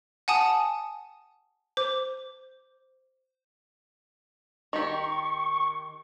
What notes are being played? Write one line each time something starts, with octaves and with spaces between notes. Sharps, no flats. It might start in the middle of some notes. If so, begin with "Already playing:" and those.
F#5 G#5 A5 D#6
C5 D6
D#3 G4 C#6